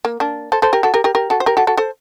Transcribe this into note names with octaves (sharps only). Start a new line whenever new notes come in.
A#3
A#3 D4
A4 C5
A4 C5
G4 A#4
F#4 A4
G4 A#4
G4 A#4
G4 A#4
F#4 A4
C5
G4 A#4
F#4 A4
F#4 A4
A4 C5